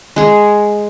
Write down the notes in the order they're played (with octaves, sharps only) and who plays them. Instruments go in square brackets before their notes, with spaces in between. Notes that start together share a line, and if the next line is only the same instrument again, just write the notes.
[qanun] G#3 G#4